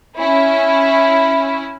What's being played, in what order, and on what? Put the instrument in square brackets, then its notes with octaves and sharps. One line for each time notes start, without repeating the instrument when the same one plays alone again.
[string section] C#4 E4